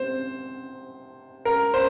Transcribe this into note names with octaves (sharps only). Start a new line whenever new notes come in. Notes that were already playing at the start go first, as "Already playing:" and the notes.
Already playing: C3 C5
A#4
C5